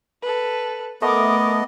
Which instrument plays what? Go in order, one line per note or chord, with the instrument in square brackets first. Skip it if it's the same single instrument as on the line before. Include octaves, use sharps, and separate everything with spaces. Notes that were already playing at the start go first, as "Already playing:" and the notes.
[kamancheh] A4 B4
[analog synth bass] A3 [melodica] B3 D#5 [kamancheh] A#4 D6